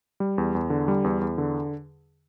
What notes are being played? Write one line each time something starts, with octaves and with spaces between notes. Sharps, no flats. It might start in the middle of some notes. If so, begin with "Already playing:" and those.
G3
E2
E2
D3
G3
E2
E2
D3